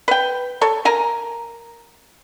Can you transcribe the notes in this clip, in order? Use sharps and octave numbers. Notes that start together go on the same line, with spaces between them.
B4 G5
A4 C#5
A#4 G#5 A#5